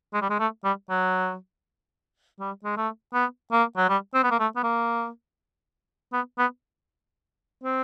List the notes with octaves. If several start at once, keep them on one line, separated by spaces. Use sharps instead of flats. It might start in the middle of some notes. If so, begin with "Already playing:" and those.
G#3
G3
G#3
A3
G3
F#3
G3
G#3
A3
B3
A#3
F#3
G3
C4
B3
A#3
A3
B3
A#3
B3
B3
C4